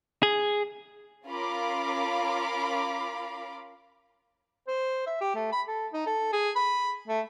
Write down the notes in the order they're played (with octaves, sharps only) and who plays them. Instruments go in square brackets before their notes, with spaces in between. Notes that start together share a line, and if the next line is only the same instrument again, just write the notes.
[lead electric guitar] G#4
[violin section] C#4 F4 A#4 F5 B5 D6
[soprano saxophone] C5
E5
G4
A3
B5
A4
D#4
A4
G#4
B5
A3